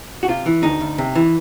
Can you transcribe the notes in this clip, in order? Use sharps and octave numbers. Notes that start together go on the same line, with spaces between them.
F#4
C3 F4
E3
D2 D#4
D2
C3
E3